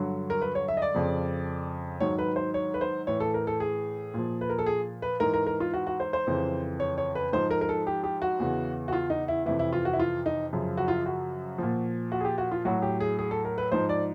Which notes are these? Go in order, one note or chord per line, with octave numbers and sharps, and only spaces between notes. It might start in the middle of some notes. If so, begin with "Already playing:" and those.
Already playing: G2 D3 F#3
A#4
B4
C#5
E5
D#5
D5
F2 C#3 F3
G#2 D#3 F#3 C#5
B4
C5
C#5
B4
C5
A2 E3 C#5
A4
A#4
A4
G#4
A#2 F3
B4
A#4
A4
G#4
B4
G#2 E3 A#4
A#4
A#4
F4
F#4
F#4
C5
C5
F2 C#3 E3
C#5
C#5
B4
G#2 F3 C5
A#4
A#4
A4
G4
G4
F#4
E2 C#3 E3
F#4
F4
D#4
E4
F2 C3 E3 E4
E4
F4
F#4
E4
F4
D#4
F#2 C#3 F3
F#4
F4
F#4
A#2 F3
F#4
G#4
G4
F#4
F4
A2 F#3 F#4
G4
G#4
G#4
A4
A#4
B4
G#2 F3 C5
D5